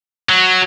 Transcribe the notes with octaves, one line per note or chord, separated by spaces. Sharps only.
F#3